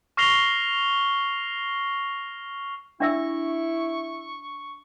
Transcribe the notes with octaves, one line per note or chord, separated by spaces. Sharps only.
C#6 F6 A#6 C7 F7 G7
D4 E4 E5 C#6 E6